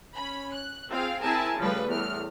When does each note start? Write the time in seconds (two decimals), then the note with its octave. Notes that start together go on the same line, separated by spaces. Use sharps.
0.16 C#4 B5
0.55 F#6
0.91 C4 F4 G#4 F5
1.23 C4 E4 G#4 A#4 G#5 A5
1.58 C#3 F3 G3 A3 B4
1.88 E2 A2 F6